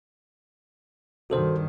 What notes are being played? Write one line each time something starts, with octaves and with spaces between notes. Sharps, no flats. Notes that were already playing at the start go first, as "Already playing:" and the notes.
G2 D#3 F#4 A4 C5